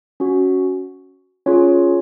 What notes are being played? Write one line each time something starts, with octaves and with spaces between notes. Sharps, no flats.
C#4 F#4
C#4 F4 G#4 C#5